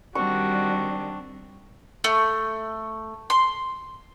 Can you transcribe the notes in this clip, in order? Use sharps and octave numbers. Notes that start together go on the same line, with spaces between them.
D#3 G3 C4 D4 F#4 C#6
A3
C6